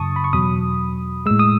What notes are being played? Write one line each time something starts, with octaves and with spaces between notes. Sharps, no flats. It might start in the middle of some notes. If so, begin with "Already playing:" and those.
Already playing: F#2 C#3 F#3 A5 C#6 D#6
B5
C#6
E2 B2 F#3 B5 D#6
A2 G#3 E6
D#6